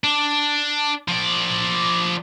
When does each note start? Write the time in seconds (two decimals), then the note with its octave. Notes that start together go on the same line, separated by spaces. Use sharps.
0.04 D4
1.08 F3 D5